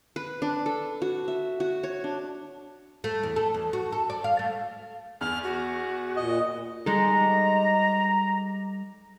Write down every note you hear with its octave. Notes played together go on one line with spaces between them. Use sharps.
B4
D4
A4
F#4
E5
F#4
C#5
D4
A3
E2
A4
E2
F#4
A4
D5
F5
A3
E2 E6 F6 F#7
F#4
A#2 D#5
G3 G#3 D#4 A4 A#5